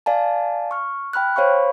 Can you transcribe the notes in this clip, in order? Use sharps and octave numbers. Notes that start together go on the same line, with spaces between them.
D5 F5 G#5 A5
C#6 F6
G5 B5 F6 F#6
C5 C#5 F5 B5 C#6